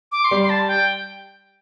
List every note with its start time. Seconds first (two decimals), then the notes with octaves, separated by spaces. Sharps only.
0.12 D6
0.24 C6
0.31 G3
0.42 C6
0.50 A5
0.68 G5